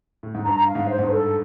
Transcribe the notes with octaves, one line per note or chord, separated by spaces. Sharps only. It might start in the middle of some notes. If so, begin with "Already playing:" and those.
A2
G#2
G2 A#5
F5
G#2
C5
G#2
G2
A4